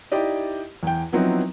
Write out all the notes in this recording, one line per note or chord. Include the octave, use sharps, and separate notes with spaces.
D#4 E4 G4 D5 D#5
E2 G5
F3 F#3 B3 C4 D#4 E4